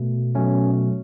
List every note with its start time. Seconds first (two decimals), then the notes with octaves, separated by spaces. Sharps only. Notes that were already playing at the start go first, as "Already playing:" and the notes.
Already playing: B2 A3
0.35 B2 F#3 A3 C#4